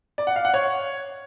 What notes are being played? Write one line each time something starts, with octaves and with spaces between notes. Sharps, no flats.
D5
F#5
F5
F#5
C#5